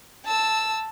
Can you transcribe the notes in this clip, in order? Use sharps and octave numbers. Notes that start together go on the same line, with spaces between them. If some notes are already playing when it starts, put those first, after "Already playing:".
A5 E6